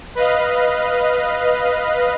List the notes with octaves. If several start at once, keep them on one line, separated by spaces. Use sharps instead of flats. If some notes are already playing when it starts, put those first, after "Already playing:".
B4 D#5 F5